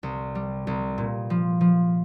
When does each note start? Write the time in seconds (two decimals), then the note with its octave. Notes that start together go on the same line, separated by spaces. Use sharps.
0.03 C2
0.35 G3
0.67 C2
0.98 A#2
1.30 F3
1.61 F3